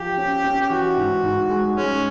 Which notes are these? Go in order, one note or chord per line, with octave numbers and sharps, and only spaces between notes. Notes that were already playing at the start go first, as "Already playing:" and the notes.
Already playing: F3 G4
C#4
C#4
G4
E3 F#4
G#2
G#2
G#3
G#3 C#4